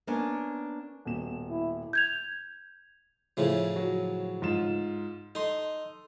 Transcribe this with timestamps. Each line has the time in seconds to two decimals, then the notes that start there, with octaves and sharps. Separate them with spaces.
0.07 A#3 B3 C#4 D4
1.05 D#1 B2 E7
1.50 E4
1.93 G6 G#6 F7
3.37 A2 C#3 F3 E4
3.76 F#3
4.42 G#2 F4 E7
5.35 D#4 A4 C6